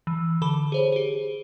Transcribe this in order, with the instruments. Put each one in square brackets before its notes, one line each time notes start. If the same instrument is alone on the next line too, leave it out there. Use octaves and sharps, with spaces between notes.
[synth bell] E3
D3 A4 B5 G7
G#4 C5 C#5
G4 G#4